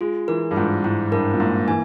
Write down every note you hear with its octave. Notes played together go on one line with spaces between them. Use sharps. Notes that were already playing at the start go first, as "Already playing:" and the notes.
G#3 F4
E3 A#4
G2
G#2 F4
G#2 E4
G2 A#4
A#2
G#2 A#3
E3 G#5